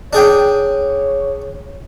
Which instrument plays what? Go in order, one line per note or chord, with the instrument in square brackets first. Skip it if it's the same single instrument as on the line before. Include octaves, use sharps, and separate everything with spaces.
[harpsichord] D4 G#4 G5 [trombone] C#5